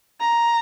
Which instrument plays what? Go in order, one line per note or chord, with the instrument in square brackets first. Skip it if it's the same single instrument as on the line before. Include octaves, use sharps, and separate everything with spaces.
[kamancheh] A#5